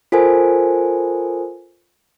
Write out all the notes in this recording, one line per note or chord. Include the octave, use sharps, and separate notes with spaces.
F4 A4 A#4 C5 G#5